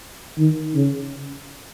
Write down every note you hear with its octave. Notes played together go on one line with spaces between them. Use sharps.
D#3
C#3